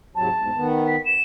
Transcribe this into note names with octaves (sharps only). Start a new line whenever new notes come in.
G#2 C3 F#3 A5
E2 G#2
D#3 B3
B6
E7